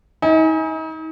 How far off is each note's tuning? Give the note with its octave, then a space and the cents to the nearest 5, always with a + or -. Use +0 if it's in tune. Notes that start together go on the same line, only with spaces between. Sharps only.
D#4 +40 G#5 +0